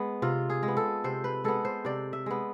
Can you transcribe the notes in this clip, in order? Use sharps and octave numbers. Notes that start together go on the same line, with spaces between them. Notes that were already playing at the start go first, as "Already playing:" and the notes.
Already playing: G#3 B3
C3 F4
G#4
G#3
B3
A4
C3 C5
B4
G#3 B3 A4
C5
C3 D5
E5
G#3 B3